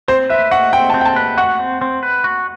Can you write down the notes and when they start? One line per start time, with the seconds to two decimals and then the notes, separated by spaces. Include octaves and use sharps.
0.08 C4 C5
0.29 B4 E5
0.51 F#4 F#5
0.73 C4 G5
0.90 A5
0.94 C4
1.01 G5
1.05 A5
1.16 B4
1.38 F#4 F#5
1.59 C4
1.82 C4
2.03 B4
2.24 F#4